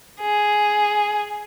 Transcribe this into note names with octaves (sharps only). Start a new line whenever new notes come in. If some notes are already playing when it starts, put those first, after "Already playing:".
G#4